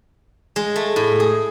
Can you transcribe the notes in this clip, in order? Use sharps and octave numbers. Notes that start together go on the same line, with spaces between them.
G#3
A3
A2
G#4